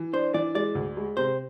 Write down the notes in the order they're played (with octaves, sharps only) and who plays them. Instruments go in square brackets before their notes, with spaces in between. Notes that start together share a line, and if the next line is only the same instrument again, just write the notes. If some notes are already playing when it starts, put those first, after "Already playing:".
Already playing: [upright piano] E3
[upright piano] D4 [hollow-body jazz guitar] C5
[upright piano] E3 [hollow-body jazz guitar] D5
[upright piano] G#3 [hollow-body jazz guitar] D5
[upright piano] D2
G#3
[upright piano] C3 [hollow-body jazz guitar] C5